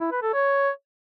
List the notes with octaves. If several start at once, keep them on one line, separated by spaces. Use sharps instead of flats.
E4
B4
A4
C#5